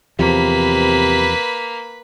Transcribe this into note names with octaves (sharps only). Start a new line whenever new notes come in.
E2 C3 F3 A#3 B4 B5